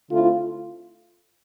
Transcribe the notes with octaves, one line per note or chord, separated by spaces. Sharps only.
D3 A3 C4 E4 F4